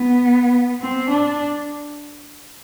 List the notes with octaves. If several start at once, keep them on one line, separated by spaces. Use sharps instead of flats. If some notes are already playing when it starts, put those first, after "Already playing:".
Already playing: B3
C4
D4